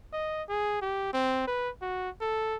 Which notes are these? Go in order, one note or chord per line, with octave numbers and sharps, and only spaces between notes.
D#5
G#4
G4
C4
B4
F#4
A4